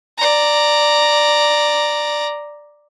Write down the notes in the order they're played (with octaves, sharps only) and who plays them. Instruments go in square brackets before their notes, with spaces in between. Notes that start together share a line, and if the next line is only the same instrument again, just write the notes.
[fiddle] D5 A#5